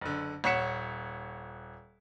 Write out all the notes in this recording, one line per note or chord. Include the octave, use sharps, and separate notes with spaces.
F#1 D3
D#1 C#5 F#5 B6 C#7 E7